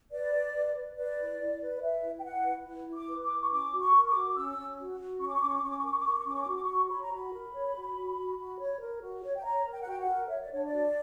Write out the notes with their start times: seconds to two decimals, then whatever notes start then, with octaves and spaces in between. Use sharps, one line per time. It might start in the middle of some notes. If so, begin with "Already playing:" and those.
0.12 B4 D5
0.33 B4
0.54 B4
0.75 B4
0.97 B4 D5
1.18 E4
1.39 E4
1.60 B4
1.76 D5
1.81 B4 E5
2.02 E4
2.19 G5
2.24 E4 F#5
2.44 B4
2.66 E4
2.87 E4
2.94 D6
3.08 B4
3.23 D6
3.30 E4
3.42 C#6
3.51 C#4 D6
3.72 F#4
3.79 C#6
3.93 A#4
4.08 D6
4.14 F#4
4.30 D6
4.35 C#4 E6
4.57 C#4
4.78 F#4
4.99 F#4
5.20 C#4 C#6
5.27 D6
5.34 C#6
5.41 C#4 D6
5.49 C#6
5.55 D6
5.62 C#4 C#6
5.70 D6
5.77 C#6
5.83 A#4 D6
5.91 C#6
5.99 D6
6.06 A#4 C#6
6.13 D6
6.19 C#6
6.26 C#4 D6
6.34 C#6
6.41 D6
6.47 F#4 C#6
6.56 D6
6.63 C#6
6.68 F#4
6.90 C#5 B5
7.02 A#5
7.11 F#4 B5
7.32 A#4
7.54 C#5
7.75 F#4
7.96 F#4
8.17 F#4
8.37 F#4
8.59 C#5
8.80 A#4
9.01 F#4
9.23 C#5
9.37 G5
9.43 C#5 A#5
9.65 A#4
9.72 G5
9.81 F#5
9.86 F#4 G5
10.00 F#5
10.08 A#4
10.28 C#5 E5
10.41 D5
10.50 D4 C#5
10.65 D5
10.72 F#4